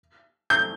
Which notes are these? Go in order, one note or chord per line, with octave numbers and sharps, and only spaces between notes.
G6